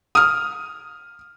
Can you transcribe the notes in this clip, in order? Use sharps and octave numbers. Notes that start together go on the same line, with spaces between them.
D#6 F6